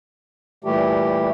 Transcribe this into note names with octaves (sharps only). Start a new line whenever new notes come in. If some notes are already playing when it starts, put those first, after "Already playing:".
A#2 E3 G3 A3 G4